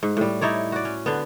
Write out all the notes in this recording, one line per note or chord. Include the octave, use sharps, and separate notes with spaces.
G#2
A2 G3
D#4 E4 C#5 D5
F#4 D5
C#4
D3 B3